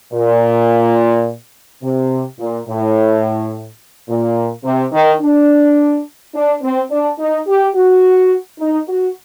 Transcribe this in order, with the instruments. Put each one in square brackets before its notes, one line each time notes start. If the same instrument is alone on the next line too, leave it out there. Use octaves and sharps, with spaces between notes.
[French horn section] A#2
C3
A#2
A2
A#2
C3
D#3
D4
D4
C4
D4
D#4
G4
F#4
D#4
F#4